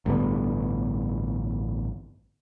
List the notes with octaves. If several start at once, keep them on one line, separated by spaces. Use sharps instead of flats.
A1 G2 D3 B3